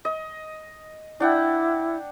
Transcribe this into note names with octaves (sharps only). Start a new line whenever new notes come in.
D#5
D4 E4 F#5 G5